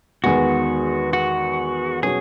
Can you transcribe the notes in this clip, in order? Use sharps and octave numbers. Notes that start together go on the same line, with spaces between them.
E2 D#3 G#3 B3 F#4
F#4
B2 F#3 C#4 F#4 G#4